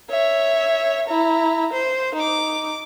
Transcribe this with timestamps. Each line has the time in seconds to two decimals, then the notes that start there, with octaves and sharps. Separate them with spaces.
0.10 C#5 E5
1.08 E4 A#5
1.73 C5
2.15 D#4 D6